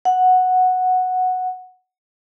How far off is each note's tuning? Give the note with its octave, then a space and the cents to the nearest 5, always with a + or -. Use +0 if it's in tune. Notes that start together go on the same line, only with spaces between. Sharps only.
F#5 -5